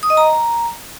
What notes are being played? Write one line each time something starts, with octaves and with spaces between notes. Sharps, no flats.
D#6
D#5
A#5